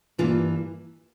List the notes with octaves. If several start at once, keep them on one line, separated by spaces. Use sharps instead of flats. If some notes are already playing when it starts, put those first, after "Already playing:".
G2 E3 A#3 F4